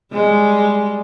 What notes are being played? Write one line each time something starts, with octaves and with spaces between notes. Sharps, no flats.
G3 G#3